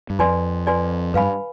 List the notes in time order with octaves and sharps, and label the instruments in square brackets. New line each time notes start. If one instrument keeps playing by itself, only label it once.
[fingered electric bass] G2
[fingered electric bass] F2 [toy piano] F4 B4 D5 G#5 C6
[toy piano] F4 B4 D5 G#5 C6
[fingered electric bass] G2 [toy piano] B4 F5 G#5 B5